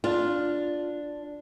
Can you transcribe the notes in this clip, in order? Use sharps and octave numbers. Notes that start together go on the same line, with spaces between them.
D4 F4